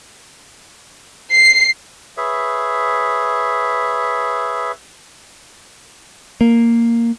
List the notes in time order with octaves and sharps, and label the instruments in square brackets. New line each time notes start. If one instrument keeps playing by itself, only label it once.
[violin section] C7
[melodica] G#4 B4 C#5 E5
[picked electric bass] A#3